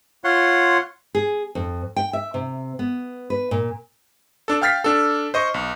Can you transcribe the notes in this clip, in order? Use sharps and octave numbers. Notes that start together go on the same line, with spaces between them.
F4 C#5 F#5 C6
G#4
F2
G5
E5
C3
B3
B4
A#2
D4 A4
F5 G5 F6 A6 B6 C7
D4 A4
C5 D#5 C#6
B1